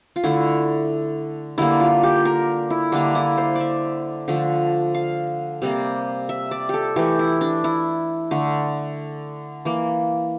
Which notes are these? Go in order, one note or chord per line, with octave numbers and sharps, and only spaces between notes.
F4
D3 A3 E4
D3 G3 A#3 E4
F4
G4
A#4
E4
D3 G3 A#3 D4
E4
C5
D5 E5
D3 F3 A3
F5
C3 G3 A#3
E5
D5
G4 A4
E3 A3 G4
E4
D4
E4
D3 A3
E3 A#3